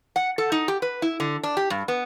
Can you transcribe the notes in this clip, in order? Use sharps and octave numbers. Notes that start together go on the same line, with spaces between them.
F#5
A4
D#4
G4
B4
E4
D3
D4
G4
G2
B3